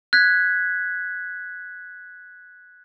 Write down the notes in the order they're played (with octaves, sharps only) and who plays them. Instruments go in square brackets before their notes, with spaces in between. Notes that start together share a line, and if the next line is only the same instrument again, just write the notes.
[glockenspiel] F#6 G#6 B6